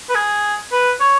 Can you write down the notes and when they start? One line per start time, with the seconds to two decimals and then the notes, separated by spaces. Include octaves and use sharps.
0.09 B4
0.15 G#4
0.72 B4
1.00 C#5